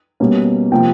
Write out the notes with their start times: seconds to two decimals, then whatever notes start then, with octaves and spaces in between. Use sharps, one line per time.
0.20 B2 G3 A#3 C#4
0.72 C3 F3 A#3 G5